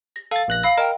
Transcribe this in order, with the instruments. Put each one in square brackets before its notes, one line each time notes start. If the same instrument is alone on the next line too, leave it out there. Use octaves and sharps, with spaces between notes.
[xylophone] A#6
[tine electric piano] A4 A6 [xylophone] F5
[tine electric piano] A#1 F#6 A#6
[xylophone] F5 B5 E6 [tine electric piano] A#6
[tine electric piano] A#4 [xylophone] D#5 G5